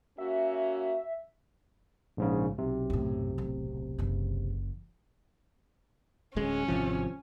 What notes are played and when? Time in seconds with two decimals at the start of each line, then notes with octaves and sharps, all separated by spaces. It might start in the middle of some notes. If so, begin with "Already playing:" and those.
0.18 A#3 C#4 F#4 E5
2.17 A#1 G#2 C#3
2.58 B1 C3
2.90 F#2 A2
3.38 D1
3.99 F#1 E3
6.36 D1 G#3 C#4
6.68 G#1 C3 F3